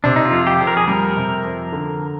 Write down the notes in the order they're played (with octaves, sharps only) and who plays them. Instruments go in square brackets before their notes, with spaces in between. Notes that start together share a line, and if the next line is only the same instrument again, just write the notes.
[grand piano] C3 [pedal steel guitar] D4
[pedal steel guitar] D#4
F4
[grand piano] F2
[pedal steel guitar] G4
[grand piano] F2
[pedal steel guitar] A#4
G#4
[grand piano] G3 [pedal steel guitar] A#4
[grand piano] C3
F2
D3